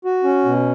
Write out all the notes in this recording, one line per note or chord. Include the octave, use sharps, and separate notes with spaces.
F#4
C#4
B2